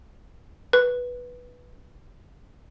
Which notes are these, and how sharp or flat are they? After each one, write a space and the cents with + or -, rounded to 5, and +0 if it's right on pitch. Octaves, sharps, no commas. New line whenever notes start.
B4 -10